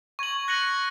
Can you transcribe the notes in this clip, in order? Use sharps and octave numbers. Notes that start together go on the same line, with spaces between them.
C#6 G#6 F#7
F#6 A#6 C#7 F#7